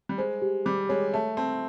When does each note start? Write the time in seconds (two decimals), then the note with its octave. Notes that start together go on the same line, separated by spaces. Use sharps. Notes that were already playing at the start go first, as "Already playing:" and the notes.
0.09 G3
0.18 G#3 C5
0.42 G4
0.66 G3 D6
0.89 G#3 C#5
1.14 A3 A5
1.37 C4 A5